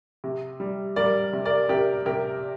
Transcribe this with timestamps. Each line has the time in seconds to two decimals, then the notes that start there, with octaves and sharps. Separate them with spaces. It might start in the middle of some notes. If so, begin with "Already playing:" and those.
0.24 C3
0.60 G3
0.96 G3 A#4 D5
1.33 C3
1.45 A#4 D5
1.69 C3 G4 A#4
2.06 C3 G4 A#4